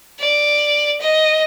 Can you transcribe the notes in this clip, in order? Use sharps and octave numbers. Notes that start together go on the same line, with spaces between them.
D5
D#5